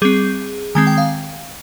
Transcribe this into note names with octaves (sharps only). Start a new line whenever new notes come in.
G3 C4 G#4
D#3 G#3 C4 G#5
G5
F5